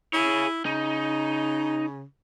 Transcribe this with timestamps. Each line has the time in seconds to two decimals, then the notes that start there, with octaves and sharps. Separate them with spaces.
0.13 E4 G#4 C#5
0.65 C#3 D#4